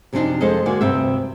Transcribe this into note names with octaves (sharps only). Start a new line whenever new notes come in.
F#2 C3 F3 C4 D4 D#4
F2 F3 G#3 A4 C5 D#5
D3 G#3 A#3 F#4 D5
D2 G2 C3 C4 E5